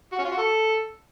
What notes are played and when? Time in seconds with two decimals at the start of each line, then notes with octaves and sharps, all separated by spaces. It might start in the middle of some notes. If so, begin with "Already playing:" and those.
0.12 F#4
0.19 C#4
0.25 F4
0.31 F#4
0.38 A4